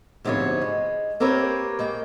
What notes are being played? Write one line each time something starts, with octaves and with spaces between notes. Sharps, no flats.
D2 G#2 C3 F3 B3 C#5
G#3
A#3 C4 G4 A#4 B4 C#5
G#3 A#3 G5